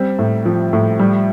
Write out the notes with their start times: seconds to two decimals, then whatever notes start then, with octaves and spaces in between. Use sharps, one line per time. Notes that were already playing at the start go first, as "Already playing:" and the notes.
Already playing: G3 C4
0.19 A2
0.45 F3
0.73 A2
0.99 G3